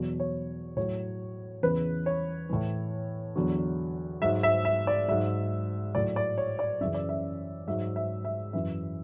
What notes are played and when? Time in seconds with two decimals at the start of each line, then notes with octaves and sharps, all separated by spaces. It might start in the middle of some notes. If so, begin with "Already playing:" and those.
Already playing: E2 B2 F#3
0.20 C#5
0.77 A2 F#3 C#5
1.63 E2 C#3 E3 B4
2.06 C#5
2.49 A2 E3
3.36 E2 D3 F#3
4.22 G#2 F#3 E5
4.43 E5
4.65 E5
4.87 D5
5.08 G#2 F#3 E5
5.94 A2 F#3 D5
6.16 D5
6.38 C#5
6.59 D5
6.81 F#2 C#3 E3 E5
6.95 D5
7.09 E5
7.68 G#2 F#3 E5
7.96 E5
8.25 E5
8.53 F#2 E3 E5